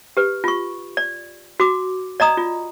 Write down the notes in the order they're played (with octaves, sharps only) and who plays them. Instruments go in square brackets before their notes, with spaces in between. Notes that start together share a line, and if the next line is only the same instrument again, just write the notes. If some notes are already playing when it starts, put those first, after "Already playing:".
[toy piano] G4 B4
F4 C#6
D5
F#4 D6
D5 D#5 A#5 D#6
F4